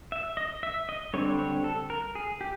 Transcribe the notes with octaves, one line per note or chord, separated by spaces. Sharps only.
E5
D#5
E5
D#5
D3 G3 C4 C#5
C#5
A4
A#4
G#4
G4